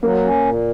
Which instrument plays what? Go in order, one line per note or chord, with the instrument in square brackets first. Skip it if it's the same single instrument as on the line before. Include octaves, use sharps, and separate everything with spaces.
[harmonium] F#3 [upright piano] A#3
[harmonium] C#4
A#2